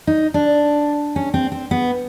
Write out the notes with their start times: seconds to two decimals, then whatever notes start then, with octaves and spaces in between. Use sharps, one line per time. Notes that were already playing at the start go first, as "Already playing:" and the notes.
0.07 D#4
0.34 D4
1.16 C#4
1.34 C4
1.52 C4
1.71 B3